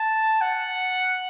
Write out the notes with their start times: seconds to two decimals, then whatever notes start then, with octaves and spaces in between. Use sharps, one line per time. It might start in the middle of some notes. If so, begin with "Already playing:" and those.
Already playing: A5
0.41 F#5